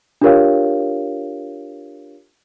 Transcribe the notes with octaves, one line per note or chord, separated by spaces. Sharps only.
D4 F4 G4 A#4 C#5 F5